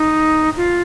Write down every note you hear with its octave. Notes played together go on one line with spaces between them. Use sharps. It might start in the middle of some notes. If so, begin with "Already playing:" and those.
Already playing: D#4
F4